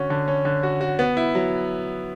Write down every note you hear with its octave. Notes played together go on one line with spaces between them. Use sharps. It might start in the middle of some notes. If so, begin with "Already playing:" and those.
Already playing: D3 C#4 F#4
D3
C#4
D3
F#4
F#4
B3
E4
F#3